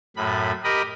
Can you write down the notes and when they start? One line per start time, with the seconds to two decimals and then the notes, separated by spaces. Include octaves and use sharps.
0.16 F#2 A2 B5
0.64 G4 A#4 D#5 B5